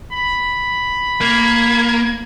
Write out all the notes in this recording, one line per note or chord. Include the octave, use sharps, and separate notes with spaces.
B5
A#3 G#6